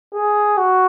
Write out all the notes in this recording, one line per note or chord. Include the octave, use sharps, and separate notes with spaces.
G#4
F#4